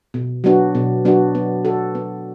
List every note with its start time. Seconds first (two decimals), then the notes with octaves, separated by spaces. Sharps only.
0.14 B2
0.44 F#3 B3 D4 F#4
0.75 B2
1.05 F#3 B3 D4 F#4
1.35 B3
1.65 F#4 A4
1.95 B3